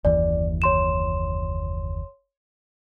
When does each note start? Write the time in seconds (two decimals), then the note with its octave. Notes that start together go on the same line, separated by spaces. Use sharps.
0.05 F#1 D#2 E3 D5
0.62 C#5 C6 E7